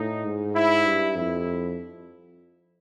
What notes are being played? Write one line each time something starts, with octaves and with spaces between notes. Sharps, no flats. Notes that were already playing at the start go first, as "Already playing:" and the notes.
Already playing: A2 D#4
G#2
E4
G2
F2 E4